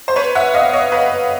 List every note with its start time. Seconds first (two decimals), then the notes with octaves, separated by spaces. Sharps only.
0.08 C5
0.16 B4 C#5
0.35 E5 F#5
0.54 D#5 F5
0.73 C#5 D#5
0.92 B4